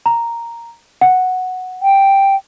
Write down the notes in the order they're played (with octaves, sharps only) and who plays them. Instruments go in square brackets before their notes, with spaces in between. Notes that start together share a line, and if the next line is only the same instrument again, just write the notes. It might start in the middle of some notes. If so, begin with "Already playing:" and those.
[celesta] A#5
F#5
[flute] G5